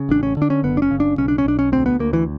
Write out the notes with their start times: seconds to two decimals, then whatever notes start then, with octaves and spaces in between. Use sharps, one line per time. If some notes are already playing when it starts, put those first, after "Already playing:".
Already playing: C#3
0.09 A1 D4
0.23 C#4
0.37 D3 D4
0.50 C#4
0.63 F#1 B3
0.77 D4
0.82 C#4
0.91 C#3
1.00 D4
1.18 B1 C#4
1.28 D4
1.38 C#4
1.45 B1 D4
1.59 C#4
1.72 D2 C4
1.86 B3
1.99 D2 A#3
2.13 E3